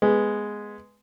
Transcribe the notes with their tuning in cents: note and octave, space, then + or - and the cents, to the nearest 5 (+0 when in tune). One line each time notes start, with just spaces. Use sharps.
G#3 +0 B3 +0